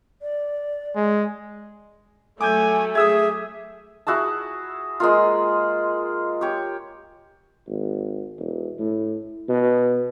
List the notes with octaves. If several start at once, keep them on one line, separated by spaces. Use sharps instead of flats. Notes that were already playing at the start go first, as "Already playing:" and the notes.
D5
G#3
F#3 A3 G#5 D6 G6
G#4 E5 D#6 E6 G#6
E4 F#4 G#4 A5
G#3 A#3 F4
G4 C#5
G#1
E1
A2
B2